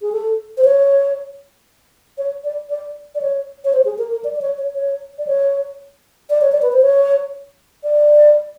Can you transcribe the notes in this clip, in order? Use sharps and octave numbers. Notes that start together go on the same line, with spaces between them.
G#4
A4
C5
C#5
C#5
D5
D5
D5
C#5
C#5
C5
G#4
A#4
A#4
D5
D5
C#5
C#5
C#5
D5
C#5
D5
C#5
D5
B4
C5
C#5
D5